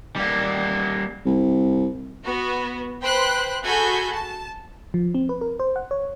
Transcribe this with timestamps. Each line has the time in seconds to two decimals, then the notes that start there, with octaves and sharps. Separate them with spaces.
0.16 G3 A#3
1.25 C2
2.23 B3 F#4
3.01 B4 C5 G5 B5 C6 F#6
3.63 F#4 G#4 A4 G#5 B5 G6
4.15 A5
4.94 F3
5.14 C4
5.29 B4
5.41 A#4
5.60 C5
5.76 F#5
5.91 C#5